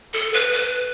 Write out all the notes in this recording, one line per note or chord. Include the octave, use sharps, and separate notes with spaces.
A4
B4
B4